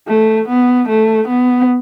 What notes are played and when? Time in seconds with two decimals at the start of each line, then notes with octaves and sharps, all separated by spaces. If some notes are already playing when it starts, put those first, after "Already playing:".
0.08 A3
0.48 B3
0.88 A3
1.28 B3